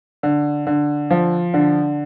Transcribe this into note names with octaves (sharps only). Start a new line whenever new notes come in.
D3
D3
F3
D3